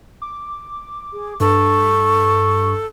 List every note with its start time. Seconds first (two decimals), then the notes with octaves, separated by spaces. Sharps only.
0.22 D6
1.13 G#4
1.40 G2 A4 C#6